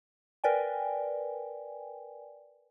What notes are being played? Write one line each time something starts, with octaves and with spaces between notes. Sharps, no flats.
A#4 B4 D5 G5 G#5